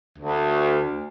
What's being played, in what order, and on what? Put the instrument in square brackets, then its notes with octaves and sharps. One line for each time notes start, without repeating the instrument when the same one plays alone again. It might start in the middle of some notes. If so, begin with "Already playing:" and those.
[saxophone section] D2